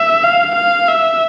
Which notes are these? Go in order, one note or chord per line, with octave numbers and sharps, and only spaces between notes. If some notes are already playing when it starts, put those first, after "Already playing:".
Already playing: E5
F5
F5
E5